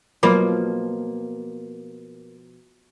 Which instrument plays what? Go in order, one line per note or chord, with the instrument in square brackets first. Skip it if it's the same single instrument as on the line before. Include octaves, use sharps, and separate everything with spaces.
[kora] B2 F3 F4 [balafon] F#3 B5 D6 [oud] A#3